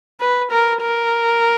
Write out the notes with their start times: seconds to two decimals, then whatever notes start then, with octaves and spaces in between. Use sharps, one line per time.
0.21 B4
0.52 A#4
0.82 A#4